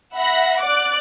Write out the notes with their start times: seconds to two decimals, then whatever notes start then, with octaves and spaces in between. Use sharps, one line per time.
0.14 E5 F#5 B5 A#6
0.61 D5 D6 F#6